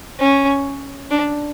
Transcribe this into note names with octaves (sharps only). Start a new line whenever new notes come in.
C#4
D4